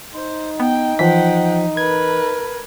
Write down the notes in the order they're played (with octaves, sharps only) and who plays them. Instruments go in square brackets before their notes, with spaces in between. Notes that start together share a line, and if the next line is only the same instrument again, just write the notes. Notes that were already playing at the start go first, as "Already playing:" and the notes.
[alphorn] D#4 [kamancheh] C5
[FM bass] B3 [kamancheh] G5
[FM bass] E3 [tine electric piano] F3 B6 [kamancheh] F#5 G5
[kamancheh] A#4 B4 [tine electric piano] G#6